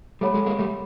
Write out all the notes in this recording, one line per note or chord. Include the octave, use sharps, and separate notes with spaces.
G3 A3 A4 C#5 F#5 B5
F#3 G#3
G#3 A#3
G3 A3